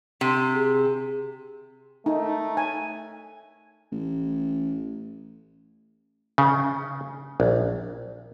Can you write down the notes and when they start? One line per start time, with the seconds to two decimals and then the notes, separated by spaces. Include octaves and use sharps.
0.21 C3
0.55 G#4
2.06 A3 D#4
2.57 G#5
3.92 A1
6.38 C#3
7.40 A#1